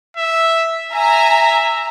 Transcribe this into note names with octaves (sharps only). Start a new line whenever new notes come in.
E5
E5 G#5 A#5